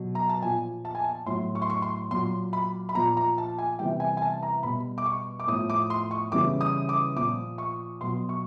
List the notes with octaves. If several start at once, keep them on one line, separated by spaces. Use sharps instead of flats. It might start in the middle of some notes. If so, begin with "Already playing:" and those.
Already playing: B2 F#3
A#5
A5
A#2 F3 G#5
A5
G#5
A5
A2 F#3 C6
C#6
C6
C#6
C6
A#2 F#3 C6
B5
B5
A#2 F3 A#5
A#5
A5
G#5
C3 E3 G3 G5
G#5
G#5
A5
A#5
B2 G3 B5
D6
C#6
D6
A2 D#6
F3
D6
C6
C#6
C#3 E3 G3 D6
D#6
D6
A#2 F3 D6
C#6
B2 F#3 C6
C#6